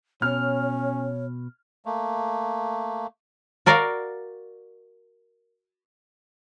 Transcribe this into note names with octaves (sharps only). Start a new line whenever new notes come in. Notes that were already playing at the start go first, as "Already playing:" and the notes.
B2 C#4 C#5 F6
A3 A#3
F#4 A#4 D5 F5